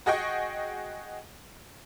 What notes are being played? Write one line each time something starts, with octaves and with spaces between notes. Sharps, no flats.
F#4 G#4 D#5 F#5 G5 C#6